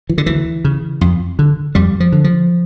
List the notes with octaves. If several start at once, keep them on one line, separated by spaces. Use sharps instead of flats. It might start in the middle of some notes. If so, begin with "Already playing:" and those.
E3
D3
D2 E3
C#3
F2
D3
F2 G3
F3
D3
F3